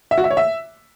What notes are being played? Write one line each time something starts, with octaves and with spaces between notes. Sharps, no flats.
E5
F#4
E5
C#5
E5